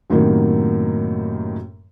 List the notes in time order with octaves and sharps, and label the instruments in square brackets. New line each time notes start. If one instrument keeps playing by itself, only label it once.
[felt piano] F#2 A2 C3 D#3 F#3 A#3